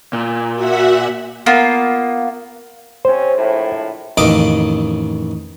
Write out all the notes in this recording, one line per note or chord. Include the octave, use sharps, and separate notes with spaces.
A#2
F#4 E5 F#5
A#3 B3 F4
C3 C4 C#4 C5
A#1 A2
A1 F2 D#3 D#5 D6